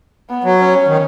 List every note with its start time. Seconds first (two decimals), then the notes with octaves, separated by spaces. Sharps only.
0.29 B3
0.44 F#3
0.59 C#4
0.87 D#3